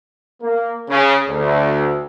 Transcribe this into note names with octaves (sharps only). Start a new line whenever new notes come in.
A#3
C#3
D2